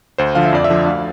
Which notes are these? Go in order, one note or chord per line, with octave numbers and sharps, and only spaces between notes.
D2 C5
D3 F3 F5
E5
F2 D5
E5
D3 F3
D2 F5